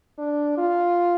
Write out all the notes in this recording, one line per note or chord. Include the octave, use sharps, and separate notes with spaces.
D4
F4